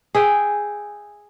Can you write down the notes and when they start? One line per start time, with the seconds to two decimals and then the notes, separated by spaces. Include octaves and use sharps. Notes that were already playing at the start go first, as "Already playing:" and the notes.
0.15 G#4 E5 G5